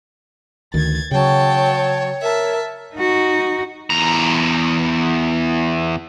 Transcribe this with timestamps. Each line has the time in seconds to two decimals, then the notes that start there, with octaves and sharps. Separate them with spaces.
0.74 D2 D#3 G#6 A6
1.11 C#3 F#3 C#5 G5 A5
2.22 A#4 E5 A5
2.95 D#4 F#4
3.90 E2 A#5